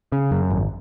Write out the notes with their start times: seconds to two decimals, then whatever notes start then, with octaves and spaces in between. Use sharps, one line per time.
0.12 C#3
0.31 F#2
0.50 G#1